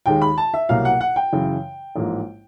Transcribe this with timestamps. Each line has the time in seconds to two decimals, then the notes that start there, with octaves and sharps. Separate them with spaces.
0.06 D#2 D#3 G#3 G5
0.22 B5
0.38 A5
0.54 E5
0.69 C2 B2 F#3 A#3 F5
0.85 F#5
1.01 F#5
1.16 G5
1.32 F#2 C#3 E3
1.96 A1 G#2 F3 A#3